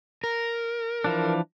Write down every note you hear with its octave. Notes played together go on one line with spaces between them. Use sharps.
A#4
E3 F3 D4